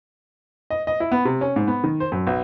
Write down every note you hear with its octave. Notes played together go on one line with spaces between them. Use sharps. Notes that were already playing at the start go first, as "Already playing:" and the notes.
D#5
D#5
E4
B3
C3
C#4
G#2
B3
D#3
C5
F#2
B1